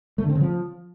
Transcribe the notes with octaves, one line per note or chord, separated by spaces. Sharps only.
A3
D3
C4
C#3
F3